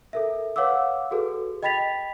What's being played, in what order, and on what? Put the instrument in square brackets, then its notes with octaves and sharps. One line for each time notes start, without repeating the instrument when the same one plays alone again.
[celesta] A4 A#4 E5
B4 C#5 F5 F#5 D6 E6
F#4 G#4 A4 B4
D#5 G5 B5 A6 B6 F7